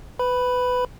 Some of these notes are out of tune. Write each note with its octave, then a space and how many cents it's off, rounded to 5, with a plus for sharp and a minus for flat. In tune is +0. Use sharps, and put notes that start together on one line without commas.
B4 +20 B5 +0